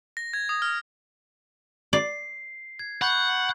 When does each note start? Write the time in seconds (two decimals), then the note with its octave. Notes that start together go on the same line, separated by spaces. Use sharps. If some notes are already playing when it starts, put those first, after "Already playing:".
0.17 A#6
0.33 G#6
0.49 D#6
0.62 F6
1.93 D5 C7
2.79 G#6
3.02 F#5 B5 C#6 G6